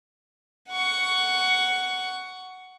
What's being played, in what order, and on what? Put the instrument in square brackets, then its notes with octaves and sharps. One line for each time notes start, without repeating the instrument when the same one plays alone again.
[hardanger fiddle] F#5 C#6